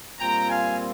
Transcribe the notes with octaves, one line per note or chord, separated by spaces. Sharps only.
A#2 G3 C4 F4 G5 A#5
F5 G#5